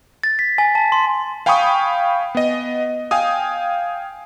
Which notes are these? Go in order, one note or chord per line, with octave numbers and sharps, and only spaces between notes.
A6
B6
G#5
A5
C6
F5 G5 G#5 B5 C#6 D#6
B3 D#5
F5 G5 G#5 D#6